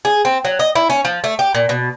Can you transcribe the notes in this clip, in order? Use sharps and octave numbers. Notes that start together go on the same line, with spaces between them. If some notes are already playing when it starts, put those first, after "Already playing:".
G#4
C4
F#3
D#5
E4
C#4
F3
A3
G4
A#2
B2